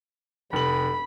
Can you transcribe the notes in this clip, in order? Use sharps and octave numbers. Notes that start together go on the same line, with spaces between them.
F1 B5 F#7